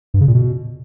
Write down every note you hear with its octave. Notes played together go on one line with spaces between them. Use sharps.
G2
C#3
A#2
B2